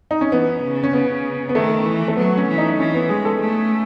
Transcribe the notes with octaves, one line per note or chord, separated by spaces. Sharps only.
D#4
C#4
E3 B3
C#3
C#4
C#3 B3
B3
D#3 A3
E3
A3
F#3 B3
C#4
E3
D#4
E3 C#4
B3
G#3 G#4
A4
A3